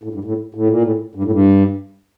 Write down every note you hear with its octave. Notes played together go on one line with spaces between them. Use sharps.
A2
G2
A2
A2
A#2
A2
G2
A2
G2